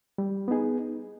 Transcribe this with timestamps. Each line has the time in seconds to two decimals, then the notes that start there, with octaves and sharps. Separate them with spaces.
0.18 G3
0.48 B3 D#4 G#4